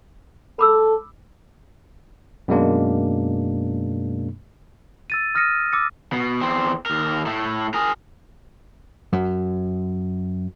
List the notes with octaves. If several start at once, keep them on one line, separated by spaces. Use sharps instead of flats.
A4 B5 D6 E6
F#2 B2 G#3 A#3 D4
E6 A6 D#7
D#6 F6 A6 A#6 C#7 D#7
D6 E6 A6 C#7
B2
E2 C4
D#2 A#4
A2 A3
G#4 A#4
F#2